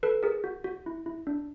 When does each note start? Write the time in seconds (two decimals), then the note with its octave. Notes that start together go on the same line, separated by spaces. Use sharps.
0.03 A4 B4
0.23 G#4 A#4
0.44 F#4
0.64 F#4
0.86 E4
1.06 E4
1.27 D4